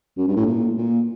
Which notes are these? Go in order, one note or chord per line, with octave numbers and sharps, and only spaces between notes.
F#2
G2
A2
A#2
A#2